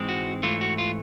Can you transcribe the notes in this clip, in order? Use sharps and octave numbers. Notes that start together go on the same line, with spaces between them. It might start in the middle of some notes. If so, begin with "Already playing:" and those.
Already playing: G#2 E3 G#3 C4
F#4
G#2 E3 A3 F4
F#4
F4